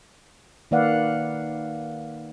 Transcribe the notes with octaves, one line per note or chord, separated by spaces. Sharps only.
D#3 A#3 B4 D5 F5 F#5